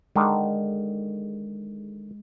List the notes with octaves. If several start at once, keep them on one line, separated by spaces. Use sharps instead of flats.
D3 D#3 G#3